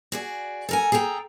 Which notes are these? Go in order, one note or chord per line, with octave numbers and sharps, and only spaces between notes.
F#4 G#4 D5
A4 A#4 G#5
G#4 A4 G5 G#5 A#5